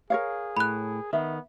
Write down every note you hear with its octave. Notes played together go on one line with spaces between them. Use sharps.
G#4 A#4 C#5 F5
A2 B5 F#6
D#3 B3 E5